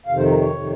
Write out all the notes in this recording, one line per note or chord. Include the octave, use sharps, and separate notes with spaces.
F2 C3 D#3 F5
C5
A#4
C#5
F2 C3 D#3